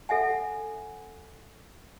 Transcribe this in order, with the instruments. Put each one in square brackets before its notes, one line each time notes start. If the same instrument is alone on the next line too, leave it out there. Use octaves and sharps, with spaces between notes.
[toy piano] A4 E5 F#5 G#5